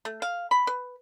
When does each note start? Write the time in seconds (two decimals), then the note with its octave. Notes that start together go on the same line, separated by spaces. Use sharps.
0.05 A3
0.22 F5
0.51 B5
0.67 B4